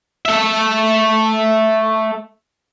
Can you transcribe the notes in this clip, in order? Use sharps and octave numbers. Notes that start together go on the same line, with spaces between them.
A3 E5